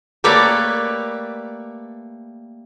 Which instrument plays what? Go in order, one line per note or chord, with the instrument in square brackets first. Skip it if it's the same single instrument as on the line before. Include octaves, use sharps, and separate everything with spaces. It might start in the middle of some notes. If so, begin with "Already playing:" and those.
[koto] G3 A3 A#3 B4 C#5 D5